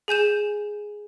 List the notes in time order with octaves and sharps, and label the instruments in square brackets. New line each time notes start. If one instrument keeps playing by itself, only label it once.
[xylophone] G#4 G#5 G6 E7